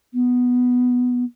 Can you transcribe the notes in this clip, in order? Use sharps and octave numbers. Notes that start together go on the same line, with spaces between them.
B3